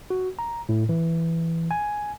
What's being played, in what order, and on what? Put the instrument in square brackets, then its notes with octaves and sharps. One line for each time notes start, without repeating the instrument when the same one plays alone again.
[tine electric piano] F#4
A#5
A2
E3
G#5